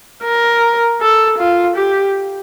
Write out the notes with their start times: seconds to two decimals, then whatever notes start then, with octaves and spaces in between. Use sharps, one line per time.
0.24 A#4
1.01 A4
1.38 F4
1.76 G4